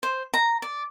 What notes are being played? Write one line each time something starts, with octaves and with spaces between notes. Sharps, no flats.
C5
A#5
D5